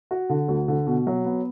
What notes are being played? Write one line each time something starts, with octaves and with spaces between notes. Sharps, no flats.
F#4
D3
D2
D3
B2
F#3
B3